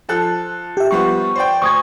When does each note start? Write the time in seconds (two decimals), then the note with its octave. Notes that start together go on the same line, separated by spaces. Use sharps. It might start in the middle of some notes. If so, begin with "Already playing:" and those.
0.09 F3 A4 F#6
0.77 G4 E5
0.91 F3 G3 B3 C#6
1.35 C5 D5 G5
1.62 D2 C#6 D#6 G#6